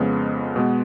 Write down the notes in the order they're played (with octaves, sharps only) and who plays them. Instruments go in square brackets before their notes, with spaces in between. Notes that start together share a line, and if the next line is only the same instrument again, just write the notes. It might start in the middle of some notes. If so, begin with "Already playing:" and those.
Already playing: [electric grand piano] F2 C#3 G#3 B3
B2 G#3 B3